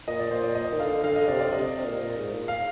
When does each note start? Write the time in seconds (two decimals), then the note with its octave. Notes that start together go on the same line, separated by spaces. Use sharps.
0.07 A#2 D#5
0.19 D5
0.31 A#2 C5
0.44 D5
0.55 A#2 D#5
0.73 D#3
0.80 D3 F5
1.04 D3 F5
1.16 D#5
1.28 C3 D5
1.40 D5
1.52 C3 D#5
1.78 C3
1.84 A#2
2.01 A#2
2.16 G#2
2.33 A#2
2.48 F5